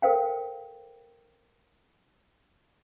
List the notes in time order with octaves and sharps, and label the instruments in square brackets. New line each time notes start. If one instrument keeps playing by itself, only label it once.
[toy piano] A4 A#4 C5 F5 G5